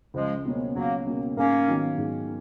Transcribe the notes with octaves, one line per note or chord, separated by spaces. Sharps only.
C#2 F3 G#3
B2 F#3 A#3 C#4
C#2 F#3 A#3
B2 F#3 A#3 C#4
G#2 A#3 C#4
D#3 F#3 B3
G#2